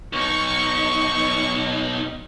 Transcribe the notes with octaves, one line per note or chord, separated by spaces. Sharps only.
B1 D#4 C#6